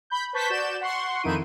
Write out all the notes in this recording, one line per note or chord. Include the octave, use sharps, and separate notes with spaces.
B5 G6
B4 C5 A5 C#6 G6 B6
F#4 D5 G6 E7
F#5 C6 C#6
F2 D#3 D#4 E4 D7 D#7